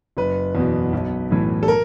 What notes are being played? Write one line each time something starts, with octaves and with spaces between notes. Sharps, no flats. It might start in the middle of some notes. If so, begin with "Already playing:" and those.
F#1 B4
E2 B2
B1
A2 E3
A4
A#4